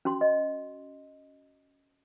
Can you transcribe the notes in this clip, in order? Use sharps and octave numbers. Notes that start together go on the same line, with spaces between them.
C#4 F#4 C6
D#5